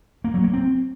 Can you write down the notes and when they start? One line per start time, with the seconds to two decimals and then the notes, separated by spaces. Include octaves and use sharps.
0.24 A#3
0.34 F#3
0.44 A#3
0.53 C4